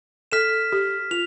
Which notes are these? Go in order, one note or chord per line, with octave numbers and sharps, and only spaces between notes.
A4 F6 B6 E7
G4
F4 F7